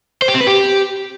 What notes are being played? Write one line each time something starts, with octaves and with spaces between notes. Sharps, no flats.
C5
G4
C4
B4
G4